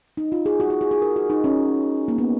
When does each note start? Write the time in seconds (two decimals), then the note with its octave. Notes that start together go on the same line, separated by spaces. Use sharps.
0.17 D#4
0.32 F4
0.46 G#4
0.60 F#4
0.70 F#4
0.81 G#4
0.91 G#4
1.02 A#4
1.16 F#4
1.30 D#4
1.44 C#4
2.08 A#3
2.18 B3